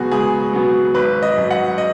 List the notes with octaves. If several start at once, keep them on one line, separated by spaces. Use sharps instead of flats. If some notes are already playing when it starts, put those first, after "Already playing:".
Already playing: C#2 B2 F#3 B3 F#4 G#4
C#2 G#4
B2 F#3 B3
G#1 B4
D#5
F#2 F#3
F#5
D#5